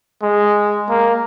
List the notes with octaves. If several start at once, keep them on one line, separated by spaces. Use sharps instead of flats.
G#3
A#3